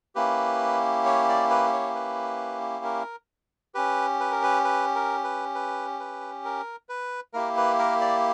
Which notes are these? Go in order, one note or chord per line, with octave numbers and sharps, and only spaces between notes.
A#3 C#4 E4 G4 B4
C#5
D5
B4
C#5
B4
A#4
C#4 G4 B4
B4
A#4
B4
B4
A#4
B4
B4
B4
A#4
B4
A#3 E4 G4 A#4
B4
A#4
D5